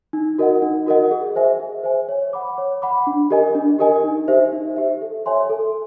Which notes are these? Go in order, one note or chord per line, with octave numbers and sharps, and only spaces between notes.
D#4
F#4 A#4 D#5 F#5
D#4
F#4 A#4 D#5 F#5
G#4
C5 E5 G#5
G#4
C5 E5 G#5
C#5
F#5 B5 D6
C#5
F#5 B5 D6
D4
G4 A#4 D#5 G#5
D4
G4 A#4 D#5 G#5
D#4
G4 C5 E5
D#4
G4 C5 E5
A4
C#5 E5 G#5 C6
A4